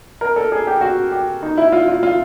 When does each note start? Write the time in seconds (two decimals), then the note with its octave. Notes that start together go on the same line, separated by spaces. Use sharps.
0.21 A#4
0.36 A4
0.52 G#4
0.67 G4
0.81 F#4
1.12 G4
1.42 D#4
1.58 E4
1.72 F4
1.88 F4
2.03 F4